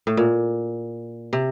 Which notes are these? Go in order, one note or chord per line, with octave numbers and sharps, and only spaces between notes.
A2
A#2
C3